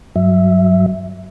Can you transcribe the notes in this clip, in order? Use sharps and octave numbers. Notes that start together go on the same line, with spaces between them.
G2 F#3 E5